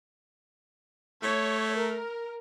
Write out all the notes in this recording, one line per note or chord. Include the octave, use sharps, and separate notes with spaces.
A3 C#5
A#4